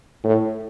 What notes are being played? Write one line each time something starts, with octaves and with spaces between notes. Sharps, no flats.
A2